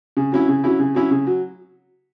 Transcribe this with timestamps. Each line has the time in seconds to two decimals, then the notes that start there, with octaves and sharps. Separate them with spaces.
0.17 C#3
0.32 F#3 C#4 E4
0.48 C#3
0.64 F#3 C#4 E4
0.80 C#3
0.95 F#3 C#4 E4
1.11 C#3
1.27 F#3